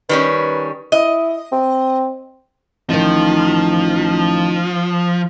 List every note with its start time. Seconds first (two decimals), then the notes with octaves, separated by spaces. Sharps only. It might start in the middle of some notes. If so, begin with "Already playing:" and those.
0.09 D#3 G3 C#4 B4
0.92 E4 D#5
1.52 C4
2.90 A1 D#3 F3 D#4